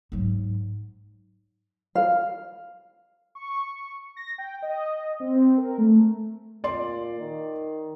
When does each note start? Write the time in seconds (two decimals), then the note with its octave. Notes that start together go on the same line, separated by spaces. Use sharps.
0.12 G#2 F#3
1.95 F5
3.35 C#6
4.17 A#6
4.38 G5
4.62 D#5
5.20 C4
5.57 A#4
5.78 A3
6.64 A#2 D5 C6
7.18 D#3